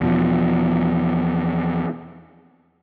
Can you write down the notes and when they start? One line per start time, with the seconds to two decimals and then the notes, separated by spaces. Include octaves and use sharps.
0.01 E2 B2 F3